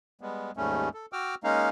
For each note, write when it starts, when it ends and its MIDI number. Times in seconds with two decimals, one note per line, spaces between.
0.21 0.51 55
0.21 0.51 56
0.21 0.51 59
0.57 0.89 39
0.57 0.89 44
0.57 0.89 55
0.57 0.89 57
0.57 0.89 61
0.94 1.06 69
1.13 1.35 66
1.13 1.35 79
1.13 1.35 86
1.13 1.35 88
1.13 1.35 89
1.44 1.69 56
1.44 1.69 58
1.44 1.69 61
1.44 1.69 63
1.44 1.69 77